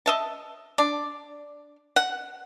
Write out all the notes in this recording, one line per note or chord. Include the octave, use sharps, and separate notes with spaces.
D#5 E5 A5
D4 D5
F#5